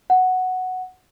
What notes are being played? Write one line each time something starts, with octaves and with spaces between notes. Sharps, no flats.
F#5